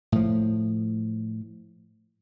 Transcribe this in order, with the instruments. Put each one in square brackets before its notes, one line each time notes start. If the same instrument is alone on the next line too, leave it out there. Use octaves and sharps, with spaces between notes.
[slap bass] A2 F3